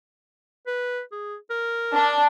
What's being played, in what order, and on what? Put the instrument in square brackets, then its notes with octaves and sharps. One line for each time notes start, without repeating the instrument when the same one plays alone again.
[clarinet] B4
G#4
A#4
[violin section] D4